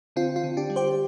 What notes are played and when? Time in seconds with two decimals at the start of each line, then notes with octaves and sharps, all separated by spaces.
0.16 D3 C4 F4
0.36 C4 F4
0.44 D3
0.57 D4 G4
0.70 G3
0.76 G4 C5